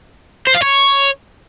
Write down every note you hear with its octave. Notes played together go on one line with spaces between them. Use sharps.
C5
F5
C#5